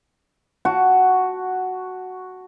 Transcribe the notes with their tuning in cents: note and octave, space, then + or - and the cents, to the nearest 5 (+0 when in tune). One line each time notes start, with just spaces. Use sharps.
F#4 +0 A5 +0